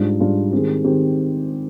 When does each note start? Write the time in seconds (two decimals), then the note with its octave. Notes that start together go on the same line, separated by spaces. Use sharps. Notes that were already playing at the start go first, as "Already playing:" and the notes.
Already playing: G#2 G3 D4 F4
0.20 G#2 G3 D4 F4
0.52 D#3 G#3 C4 G4
0.84 D#3 G#3 C4 G4